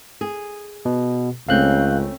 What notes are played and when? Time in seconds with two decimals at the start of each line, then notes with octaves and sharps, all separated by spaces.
0.21 G#4
0.85 B2
1.48 C#2 C#3 A3 C4 F5 F#6 G6